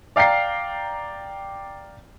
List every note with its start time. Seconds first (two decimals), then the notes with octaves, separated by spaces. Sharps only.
0.16 D5 F5 G5 A#5 C7